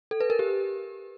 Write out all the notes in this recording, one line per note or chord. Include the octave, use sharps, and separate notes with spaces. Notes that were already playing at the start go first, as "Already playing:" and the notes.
A4
B4
A#4
G4